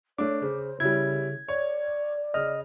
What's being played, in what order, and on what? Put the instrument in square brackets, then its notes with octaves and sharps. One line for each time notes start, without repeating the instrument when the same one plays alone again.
[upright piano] A3 D4 [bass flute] C#5 [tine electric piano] D6
[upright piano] C#3 [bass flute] C5
[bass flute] C#3 [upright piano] G3 C#4 E4 [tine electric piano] G#6
[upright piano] C#5 [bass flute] D5
[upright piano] C#3 F6 [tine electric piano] D#5